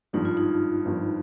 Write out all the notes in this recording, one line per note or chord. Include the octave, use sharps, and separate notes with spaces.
G#1 G2 F3 D#4
F4
D#4
G#1 G2 F3